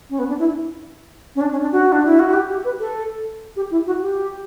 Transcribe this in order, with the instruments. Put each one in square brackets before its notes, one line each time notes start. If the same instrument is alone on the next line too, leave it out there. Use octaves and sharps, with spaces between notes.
[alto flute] C#4
B3
D4
E4
C#4
D4
C#4
D4
F#4
D4
E4
F#4
G4
G4
B4
A4
G4
E4
F#4
G4